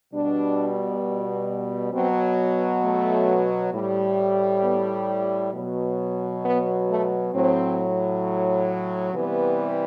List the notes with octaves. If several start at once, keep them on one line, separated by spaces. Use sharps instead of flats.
B2 G3 D4
B2 F#3 C4
A3
A2 G3
B3
B2 F#3
B3
A3
A2 F#3 C4
C3 E3 G3 B3